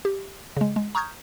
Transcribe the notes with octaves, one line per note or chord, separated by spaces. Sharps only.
G4
C#3 G#3
G#3
A#5 C#6 D#6 F6 G6 G#6